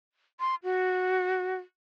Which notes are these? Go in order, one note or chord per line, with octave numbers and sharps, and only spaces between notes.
C6
F#4